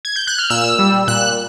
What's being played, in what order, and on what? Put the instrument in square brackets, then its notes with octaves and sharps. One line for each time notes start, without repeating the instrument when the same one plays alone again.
[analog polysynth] G#6
G6
F#6
F6
A#2 E6
G3
A#2 F#6